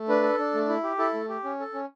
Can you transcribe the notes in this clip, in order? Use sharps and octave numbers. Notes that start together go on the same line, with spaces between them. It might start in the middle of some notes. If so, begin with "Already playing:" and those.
Already playing: A3
D4 B4
A4
D4
A3
E4
G4
E4 A4
A3
G4
C#4
A4
C#4